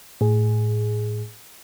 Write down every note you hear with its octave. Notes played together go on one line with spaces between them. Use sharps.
A2 G#4